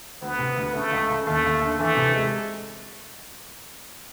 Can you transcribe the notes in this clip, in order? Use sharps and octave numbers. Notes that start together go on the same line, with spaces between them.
D2 B3
C3
D2
C#3 A3
C#2
C#3
D#2 A3
D#2
D3
E3 A3
C3
G#3